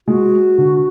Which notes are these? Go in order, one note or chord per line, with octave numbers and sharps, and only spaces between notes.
G#3 F#4
D3